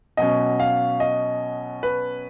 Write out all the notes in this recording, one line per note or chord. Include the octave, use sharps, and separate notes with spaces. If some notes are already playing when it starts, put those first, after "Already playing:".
B2 F#3 C#4 D#5
F5
D#5
B4